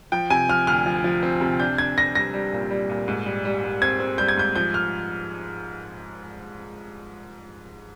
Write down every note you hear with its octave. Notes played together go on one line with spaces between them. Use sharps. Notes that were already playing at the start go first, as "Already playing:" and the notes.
F3 G5
C3 G#5
F3 F6
D2 F6
F3
F3
C4
C3
D4 G6
D4 G#6
D4 A#6
G3 A#6
G3
A#2
G3
A#2
G#2
G3
G3
G3
C4 G#6
C4
G3 G6
G#6
G#2 G6
F3 G6
F6